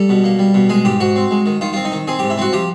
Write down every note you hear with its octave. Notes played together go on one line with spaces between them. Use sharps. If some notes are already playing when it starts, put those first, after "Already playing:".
Already playing: G3 A4
B2
A#3
G3
B2
G#3 G#4
G#2 G4
G#2 F#4
C4
G#3
D#3
D#3 F4
C4 F4
D#4
D#3
C4 G#4
G#2 G4
E4
C4 F#4
F3 G4